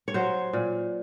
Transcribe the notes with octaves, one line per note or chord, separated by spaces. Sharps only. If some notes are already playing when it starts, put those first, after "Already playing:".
C#5
F#3 C5
A#2